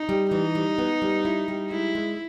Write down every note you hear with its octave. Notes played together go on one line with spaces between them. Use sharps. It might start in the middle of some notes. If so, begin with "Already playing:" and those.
Already playing: D#4
G3
E3 D#4
G3
B3
G3
E4
G3
G#3 E4
G#3